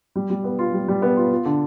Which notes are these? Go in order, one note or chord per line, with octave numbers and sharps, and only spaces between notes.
G3
G3
B3
F4
G3
G3
B3
F4
F4
D3